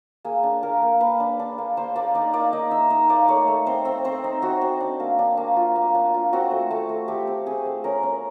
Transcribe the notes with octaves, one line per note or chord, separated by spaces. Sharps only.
A#3 G#4
D4
A#3 A#4
A#3
A#3 B4
D4
D4
A#3
A#3 C5
A#3 D5
D#4 D5
A#3 D5
D#4 D#5
D#4 E5
D#4 D#5
A#3 D5
A3 C#5
A3
C4 C5
C4
C4 C5
D#4
C4 F#4
C4
D4
A#3
D4
A#3
F4
A#3
D4
F4
C4 F#4
A3
A3
A3
A3 G4
C4
C4 G#4
A3
C#4 A#4
C#4